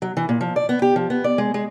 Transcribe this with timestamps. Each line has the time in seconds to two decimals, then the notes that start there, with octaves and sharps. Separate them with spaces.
0.02 F#3
0.17 E3
0.29 A#2
0.41 F3
0.56 D5
0.69 B3
0.82 G4
0.96 F3
1.10 B3
1.24 D5
1.38 G#3
1.54 G#3